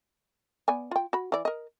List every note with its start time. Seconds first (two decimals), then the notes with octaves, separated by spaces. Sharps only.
0.68 B3 D5 G#5
0.91 F4 G5
1.13 F#4 B5
1.32 E3 D5
1.45 A#4 D#5